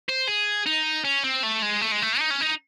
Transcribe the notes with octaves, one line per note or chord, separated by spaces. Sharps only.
C5
G#4
D#4
C#4
C4
A3
G#3
A3
G#3
A3
D#4
C#4
D#4